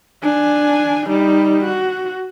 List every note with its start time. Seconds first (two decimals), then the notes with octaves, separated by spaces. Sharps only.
0.22 D4 G#5
1.07 G3 D#4
1.65 F#4